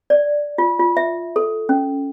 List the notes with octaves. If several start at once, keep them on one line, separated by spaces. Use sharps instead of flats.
D5
F4
F4
E5
A4
C#4